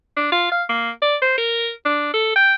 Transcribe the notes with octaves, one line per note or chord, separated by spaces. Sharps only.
D4
F4
F5
A#3
D5
C5
A#4
D4
A4
G5